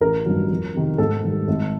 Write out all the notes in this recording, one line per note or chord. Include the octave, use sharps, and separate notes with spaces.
A1 A#4
G2 D#3 F#3
F2
C3 D#3
G#2 A4
D#3 G3
G#1